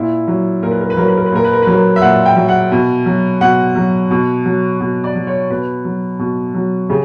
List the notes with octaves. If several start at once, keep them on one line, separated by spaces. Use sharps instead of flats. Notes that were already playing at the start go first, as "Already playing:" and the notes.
Already playing: A#2 E4
F#3
A#2 A#4
B4
A#4
B4
F#3 A#4
B4
A#4
B4
A#2 A#4
B4
A#4
B4
F#3 A#4
E5
A#2 F#5
G5
F#3
F#5
B2
F#3
B2 F#5
F#3
B2
F#3
B2
D5
F#3
C#5
B2 B4
F#3
B2
F#3
C#3 G4